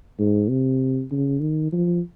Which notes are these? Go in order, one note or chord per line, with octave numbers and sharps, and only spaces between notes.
G#2
C3
C#3
D#3
F3